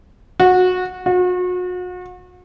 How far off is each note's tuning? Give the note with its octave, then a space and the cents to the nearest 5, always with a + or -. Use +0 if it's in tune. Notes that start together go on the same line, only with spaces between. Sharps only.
F#4 -20
F#4 -40